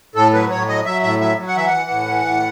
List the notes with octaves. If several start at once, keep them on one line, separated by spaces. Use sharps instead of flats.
A2 A4
F#3 B4
A2 C#5
F#3 D#5
F#3 E5
A2 E5
F#3 E5
F#3
F#5
E3 E5
F#5
E3
A2
E3
A2